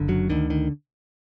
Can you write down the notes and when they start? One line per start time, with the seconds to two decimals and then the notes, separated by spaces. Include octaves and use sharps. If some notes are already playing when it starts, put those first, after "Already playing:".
Already playing: F#1 D3
0.08 F#2 F#3
0.30 D2 D3 D#3
0.50 D#3